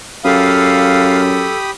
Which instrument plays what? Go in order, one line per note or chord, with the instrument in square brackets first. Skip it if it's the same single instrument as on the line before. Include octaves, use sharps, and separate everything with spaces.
[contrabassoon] F#2 [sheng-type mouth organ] G4 B5 D#6 [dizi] A4 [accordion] F5